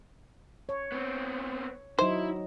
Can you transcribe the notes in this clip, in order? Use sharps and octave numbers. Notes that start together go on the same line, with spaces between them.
C#5
B3 C4
F#3 D#4 E4 C5